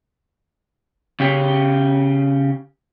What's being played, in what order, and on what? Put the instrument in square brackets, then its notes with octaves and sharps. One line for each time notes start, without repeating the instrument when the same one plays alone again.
[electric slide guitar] C#3 C#4 G4